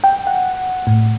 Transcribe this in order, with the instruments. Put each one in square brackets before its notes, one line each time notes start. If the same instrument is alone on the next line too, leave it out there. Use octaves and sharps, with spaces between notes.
[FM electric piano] G5
F#5
A2